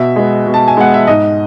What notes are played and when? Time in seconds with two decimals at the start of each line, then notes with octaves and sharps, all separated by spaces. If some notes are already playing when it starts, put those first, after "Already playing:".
Already playing: B2 E5
0.16 G#3 B3
0.46 B2
0.54 A5
0.68 G#5
0.77 G#3 B3 F#5
0.94 E5
1.07 G#2 D#5